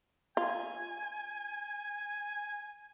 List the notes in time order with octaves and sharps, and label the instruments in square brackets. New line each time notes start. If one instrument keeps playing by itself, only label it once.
[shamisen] F4 [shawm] G#5